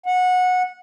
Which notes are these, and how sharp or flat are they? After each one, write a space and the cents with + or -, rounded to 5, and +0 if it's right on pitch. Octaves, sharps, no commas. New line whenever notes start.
F#5 -20